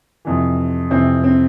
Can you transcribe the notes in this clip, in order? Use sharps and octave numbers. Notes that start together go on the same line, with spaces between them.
F2 C3 E3
F2 C3 E3 C4
C4